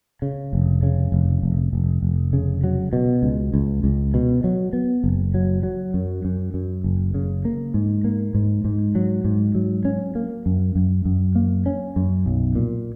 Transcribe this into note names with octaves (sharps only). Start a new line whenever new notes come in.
C#3
F1
C#3
F1
F1
F1
F1
C#3
F#3
B2
C#2
C#2
C#2
B2
F#3
B3
F#1
F#3
F#3
F#2
F#2
F#2
F#1
C#3
A#3
G#2
A#3
G#2
G#2
F#3
G#2
F#3
C#4
A#3
F#2
F#2
F#2
A#3
C#4
F#2
B1
A#2